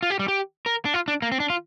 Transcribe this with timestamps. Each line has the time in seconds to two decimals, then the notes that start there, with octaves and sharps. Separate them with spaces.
0.03 F4
0.10 G4
0.19 G3
0.28 G4
0.66 A#4
0.85 D4
0.94 F4
1.08 D4
1.22 A#3
1.32 C4
1.40 D4
1.50 F4